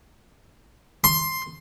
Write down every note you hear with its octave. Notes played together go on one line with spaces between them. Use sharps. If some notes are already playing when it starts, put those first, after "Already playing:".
C6